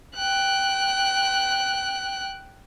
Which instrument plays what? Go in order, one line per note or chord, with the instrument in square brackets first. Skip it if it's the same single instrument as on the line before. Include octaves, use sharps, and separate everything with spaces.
[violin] G5 F#6